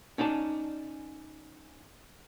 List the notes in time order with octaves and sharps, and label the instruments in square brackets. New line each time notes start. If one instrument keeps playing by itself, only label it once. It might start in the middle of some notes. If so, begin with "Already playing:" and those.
[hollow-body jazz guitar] C#4 D#4 D5 A5